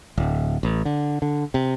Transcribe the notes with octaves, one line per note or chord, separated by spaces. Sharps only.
D1
A1
D3
D3
C3